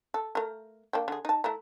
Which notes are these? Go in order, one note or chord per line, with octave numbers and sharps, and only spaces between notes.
A4
A3 A#4
A#3 D4 G5
D3 G#4
D#4 A5
A3 E4 A#5